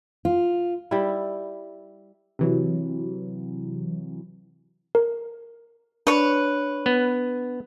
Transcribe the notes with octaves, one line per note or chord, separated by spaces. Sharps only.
F4
G3 E4
C3 E3 F#3
A#4
D4 B4 C#5
B3